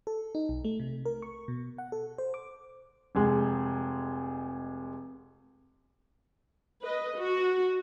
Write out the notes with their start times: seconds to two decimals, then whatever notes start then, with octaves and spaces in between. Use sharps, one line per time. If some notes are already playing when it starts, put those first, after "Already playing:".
0.07 A4
0.35 D#4
0.49 B1
0.65 A3
0.80 C3
1.06 A#4
1.22 C#6
1.48 B2
1.78 F#5
1.92 A4
2.18 C5
2.34 D6
3.15 F1 G#3
6.83 B4 D#5
7.17 F#4